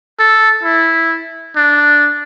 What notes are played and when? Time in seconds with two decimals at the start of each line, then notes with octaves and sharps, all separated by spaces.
0.19 A4
0.63 E4
1.56 D4